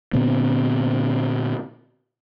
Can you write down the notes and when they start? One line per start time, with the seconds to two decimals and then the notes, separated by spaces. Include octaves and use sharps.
0.13 A#2 D3 B3 C4